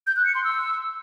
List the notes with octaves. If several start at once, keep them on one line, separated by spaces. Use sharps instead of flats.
G6
F#6
C#7
C6
E6